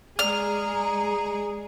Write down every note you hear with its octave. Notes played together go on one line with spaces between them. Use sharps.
G#3 G#4 D5 A#5 F6